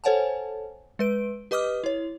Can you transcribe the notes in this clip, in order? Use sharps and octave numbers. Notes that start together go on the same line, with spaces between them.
A4 C5 C#5 F#5 G#5 A5
G#3 B4 D7
G4 B4 D#5 D6 D#6 F6
E4 C#5